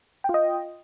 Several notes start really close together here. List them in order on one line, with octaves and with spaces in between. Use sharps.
G5 F4 D#5